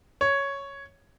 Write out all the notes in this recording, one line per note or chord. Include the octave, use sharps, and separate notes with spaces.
C#5